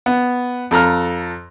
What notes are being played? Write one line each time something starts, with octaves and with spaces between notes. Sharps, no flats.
B3
F2 A4 A#5 F6